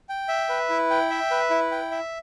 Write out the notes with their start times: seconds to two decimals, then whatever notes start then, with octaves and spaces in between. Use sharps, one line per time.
0.09 G5
0.28 E5
0.49 B4
0.70 E4
0.90 G5
1.10 E5
1.31 B4
1.50 E4
1.71 G5
1.91 E5